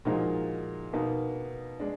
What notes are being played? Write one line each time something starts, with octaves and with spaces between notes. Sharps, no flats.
A#2 F3 G#3 D#4 F#4
B2 A#3 D#4
G#3 D4